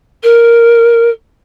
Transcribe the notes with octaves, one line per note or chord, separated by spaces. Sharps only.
A#4